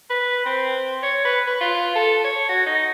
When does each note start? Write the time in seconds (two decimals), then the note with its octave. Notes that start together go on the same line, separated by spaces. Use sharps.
0.10 B4
0.46 C4
1.03 C#5
1.25 B4
1.47 B4
1.61 F4
1.96 A4
2.25 C#5
2.49 F#4
2.66 D#4